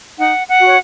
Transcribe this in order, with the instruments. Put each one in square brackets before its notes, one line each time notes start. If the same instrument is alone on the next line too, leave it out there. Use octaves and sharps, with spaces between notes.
[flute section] D#4 F#5
F#5
F#4 C#5